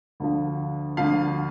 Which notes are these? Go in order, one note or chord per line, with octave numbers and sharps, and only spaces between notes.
D2 D3 F3
D2 D3 F3 F5